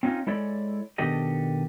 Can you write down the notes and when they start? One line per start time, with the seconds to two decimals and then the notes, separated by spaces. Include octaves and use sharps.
0.03 C4 C#4 D#4 F4
0.27 G#3 E4 A4 C#5 D5
0.98 B2 D#3 D4 G4 A4 D#5